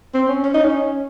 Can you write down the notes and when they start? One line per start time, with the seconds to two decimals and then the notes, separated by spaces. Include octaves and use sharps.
0.14 C4
0.29 C#4
0.44 C#4
0.54 D#4
0.64 C#4